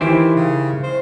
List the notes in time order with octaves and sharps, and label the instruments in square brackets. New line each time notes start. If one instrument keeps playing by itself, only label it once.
[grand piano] D#3 [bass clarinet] E3 [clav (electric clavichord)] E4 G4 C5
[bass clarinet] C#3
C5